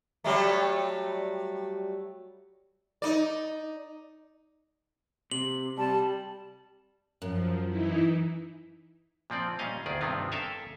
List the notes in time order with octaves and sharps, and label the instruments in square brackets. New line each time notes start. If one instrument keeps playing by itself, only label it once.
[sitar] F#3 G3 A3
D#4 D5
[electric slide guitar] C3 [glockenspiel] F#7
[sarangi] G3 [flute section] A5
[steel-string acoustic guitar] F#2 [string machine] F3
[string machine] E3 D#4 E4
[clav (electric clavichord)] A#2 F3 C4 D5
A#2 G3 C#4 D#5 F5
D2 D#3 G#4 D5
G2 C3 D#3 B3 C4 F4
A4 A#4 E5 F5 G#5 A5